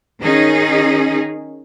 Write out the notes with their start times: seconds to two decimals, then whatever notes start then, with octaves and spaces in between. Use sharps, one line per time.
0.22 D#3 C#4 D#4 G#4